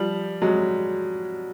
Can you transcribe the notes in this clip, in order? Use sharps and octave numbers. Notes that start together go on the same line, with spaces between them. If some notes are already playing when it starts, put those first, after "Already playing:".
Already playing: F3 G3
F#3 G#3